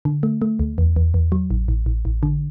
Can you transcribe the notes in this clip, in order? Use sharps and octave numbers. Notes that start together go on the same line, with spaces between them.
D3
A3
A3
D2
E2
E2
E2
F#3
A1
A1
A1
A1
D3